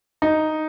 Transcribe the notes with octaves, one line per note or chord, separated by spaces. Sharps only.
D#4